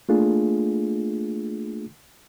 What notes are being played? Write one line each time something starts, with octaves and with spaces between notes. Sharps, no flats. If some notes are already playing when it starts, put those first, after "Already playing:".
A3 A#3 D4 F4 G#4